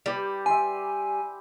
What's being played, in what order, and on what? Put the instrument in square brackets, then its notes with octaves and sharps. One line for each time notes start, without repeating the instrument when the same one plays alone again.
[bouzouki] G3 [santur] G4 B4 D6
[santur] E5 G5 C6 [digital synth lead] G#5